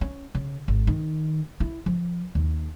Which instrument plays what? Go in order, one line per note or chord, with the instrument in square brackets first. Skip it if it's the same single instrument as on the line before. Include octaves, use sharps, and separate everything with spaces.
[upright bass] C#4
C#3
G#1
D#3
E4
F3
D#2